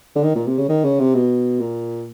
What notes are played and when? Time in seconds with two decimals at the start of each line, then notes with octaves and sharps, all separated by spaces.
0.16 D3
0.24 D#3
0.35 A#2
0.47 C3
0.58 C#3
0.69 D#3
0.85 C#3
1.00 C3
1.15 B2
1.60 A#2